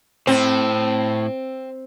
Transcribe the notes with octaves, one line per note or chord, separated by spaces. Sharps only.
A2 C4